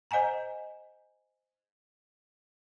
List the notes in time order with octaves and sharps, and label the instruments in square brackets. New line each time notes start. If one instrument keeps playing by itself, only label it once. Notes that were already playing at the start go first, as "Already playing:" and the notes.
[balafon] C5 D#5 F#5 G#5 A#5